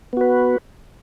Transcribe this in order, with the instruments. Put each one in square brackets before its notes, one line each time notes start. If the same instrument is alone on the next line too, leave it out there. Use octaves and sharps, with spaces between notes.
[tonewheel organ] B3
F#4
B4